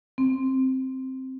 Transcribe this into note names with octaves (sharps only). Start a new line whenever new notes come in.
C4